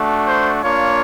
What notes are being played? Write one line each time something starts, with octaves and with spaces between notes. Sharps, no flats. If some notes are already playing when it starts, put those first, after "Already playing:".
Already playing: A3 D4 F#4
C5
A#3 D4 F4 C#5